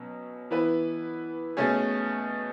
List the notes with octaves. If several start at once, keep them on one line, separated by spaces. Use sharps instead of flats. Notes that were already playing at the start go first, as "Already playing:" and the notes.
Already playing: B2 F#3 C#4
E3 B3 E4 B4
B2 A3 C#4 G#4